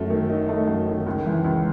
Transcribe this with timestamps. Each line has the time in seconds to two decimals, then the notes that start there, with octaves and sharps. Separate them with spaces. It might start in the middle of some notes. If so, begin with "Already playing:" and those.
Already playing: F#2 A3
0.10 D#3
0.29 D#4
0.49 A3
0.68 F#2
0.87 D#3
1.06 C#2
1.26 E3
1.44 C#2